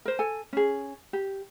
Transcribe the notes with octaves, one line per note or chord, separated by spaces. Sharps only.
A#4 C5
A4 G#5
C#4 G#4
G4